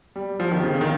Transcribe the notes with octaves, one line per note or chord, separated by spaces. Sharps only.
G3
F3
D#3
C#3
C#3
D#3